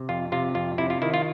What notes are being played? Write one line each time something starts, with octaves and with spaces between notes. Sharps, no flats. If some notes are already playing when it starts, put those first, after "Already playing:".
Already playing: C3
F2 F4
C3 F4
F2 F4
C3 E4
F4
D#3 E4
F4